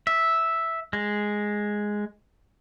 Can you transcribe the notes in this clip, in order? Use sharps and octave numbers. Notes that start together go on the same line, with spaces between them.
E5
G#3